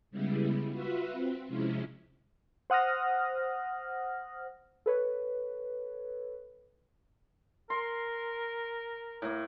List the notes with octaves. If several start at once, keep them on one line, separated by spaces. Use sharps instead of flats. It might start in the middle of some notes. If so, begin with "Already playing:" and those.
C#3 G3 G#3 B3 E4
F4 F#4 B4 E5
C4
C3 F3 G#3 C#4 E4
C5 F#5 D#6 F6 A#6
A4 B4 C#5
A#4 C6
A2 A#3